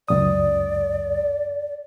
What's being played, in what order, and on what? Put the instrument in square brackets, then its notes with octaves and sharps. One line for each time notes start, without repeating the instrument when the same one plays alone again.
[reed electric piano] C#2 F#2 D#6 [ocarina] D5